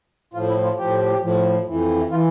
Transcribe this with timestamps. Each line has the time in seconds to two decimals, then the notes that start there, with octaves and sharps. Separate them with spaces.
0.34 A2 F3 F4
0.48 E4
0.63 F4
0.78 A2 F3 G4
1.22 A2 F3
1.66 F2 E3
2.10 E3 F4